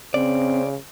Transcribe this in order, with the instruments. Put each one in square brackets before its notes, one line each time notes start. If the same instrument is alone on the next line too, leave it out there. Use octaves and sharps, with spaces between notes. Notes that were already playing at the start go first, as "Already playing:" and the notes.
[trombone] C#3 [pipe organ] C4 [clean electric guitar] D5